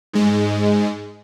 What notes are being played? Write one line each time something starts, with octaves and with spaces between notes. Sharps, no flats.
G#2 G#3